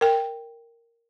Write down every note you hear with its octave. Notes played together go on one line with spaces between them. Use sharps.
A#4 G5